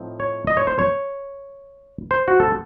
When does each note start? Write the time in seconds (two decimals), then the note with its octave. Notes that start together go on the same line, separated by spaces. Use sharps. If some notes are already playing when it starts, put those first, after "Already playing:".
Already playing: A2 F3 C4 D#4
0.20 C#5
0.47 D#5
0.57 C#5
0.67 C5
0.79 C#5
2.11 C5
2.28 F#4
2.40 A4